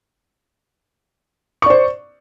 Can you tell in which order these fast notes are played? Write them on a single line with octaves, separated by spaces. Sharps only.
C#6 D5 C5